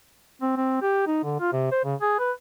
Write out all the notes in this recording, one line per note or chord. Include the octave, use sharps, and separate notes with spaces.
C4
C4
G4
D#4
D3
F4
C3
C5
C#3
G#4
B4